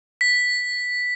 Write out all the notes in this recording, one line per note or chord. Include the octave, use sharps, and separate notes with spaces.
B6